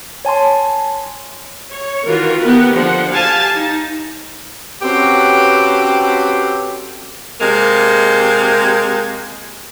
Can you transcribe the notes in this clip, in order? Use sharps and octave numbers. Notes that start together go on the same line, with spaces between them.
C#5 G#5 A5 C6
C#5
D#3 E3 F4 F#4 A#4
B3 G4 A#4 B4
D3 F3 F#5
G4 F5 G#5 A5
D#4
C4 C#4 F#4 G4 A4 B4
C3 G#3 A#3